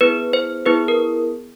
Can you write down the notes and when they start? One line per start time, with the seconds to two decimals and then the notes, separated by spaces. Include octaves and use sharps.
0.01 B3 E4 G#4 B4
0.33 C5
0.66 B3 E4 G#4 B4
0.88 A#4